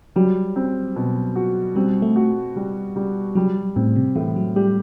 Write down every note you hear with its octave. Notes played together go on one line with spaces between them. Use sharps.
F#3 G3
C4
B2
F#4
G3 C4
A3
F#4
G3
G3
F#3 G3
A2 C4
C3
A2 E3
F#3
G3 G4